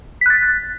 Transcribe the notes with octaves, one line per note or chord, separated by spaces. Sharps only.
F#6 A6 B6